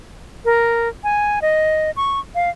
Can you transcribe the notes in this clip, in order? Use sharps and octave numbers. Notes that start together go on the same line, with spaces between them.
A#4
G#5
D#5
C#6
F5